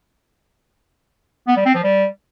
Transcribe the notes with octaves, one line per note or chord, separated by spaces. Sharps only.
B3
G3
C4
F3
G3